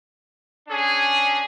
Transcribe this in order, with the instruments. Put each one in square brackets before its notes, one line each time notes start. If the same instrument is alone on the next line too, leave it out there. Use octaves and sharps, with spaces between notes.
[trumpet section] C#4 D4 G#4